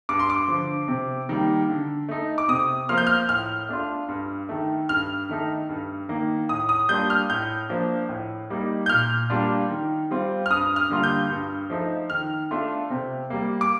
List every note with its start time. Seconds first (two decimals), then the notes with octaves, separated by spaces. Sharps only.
0.09 G2 D6
0.19 C6
0.30 D6
0.48 D3 F3
0.88 C3
1.29 D#3 G3 A#3
1.69 D3
2.09 A3 D#4
2.38 D6
2.48 C3 D#6
2.89 F3 A#3 F4 F6
2.98 G6
3.07 F6
3.29 A2 F6
3.69 A3 D4 F4
4.08 G2
4.49 D#3 A3
4.89 G2 F6
5.29 D#3 A3 D#4
5.69 G2
6.09 D#3 A#3
6.49 A2 D#6
6.69 D#6
6.89 G3 A#3 D4 F4 G6
7.10 F6
7.30 A2 G6
7.69 F3 A#3 D4
8.09 A2
8.50 G3 A#3 D#4
8.86 G6
8.89 A#2 F6
9.30 G3 A#3 D4 F4
9.70 D#3
10.11 G3 C4 F4
10.46 F6
10.50 G2 D#6
10.76 F6
10.90 D3 G3 A#3 F4
11.03 G6
11.30 G2
11.70 F3 A3 D#4
12.10 D#3 F6
12.51 A3 D4 F4
12.90 C3
13.30 G3 A#3
13.61 D6